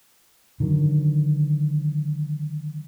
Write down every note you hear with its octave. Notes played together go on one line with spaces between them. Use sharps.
D3 D#3 F#3